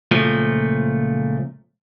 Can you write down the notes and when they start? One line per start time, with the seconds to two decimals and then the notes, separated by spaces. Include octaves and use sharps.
0.11 C#2 A#2 F3 A3